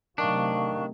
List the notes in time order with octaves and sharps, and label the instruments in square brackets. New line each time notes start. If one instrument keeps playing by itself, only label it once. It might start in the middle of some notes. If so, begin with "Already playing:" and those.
[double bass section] C3 F#3 A3 [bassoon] D#3 [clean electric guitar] D4 [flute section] F5 C#6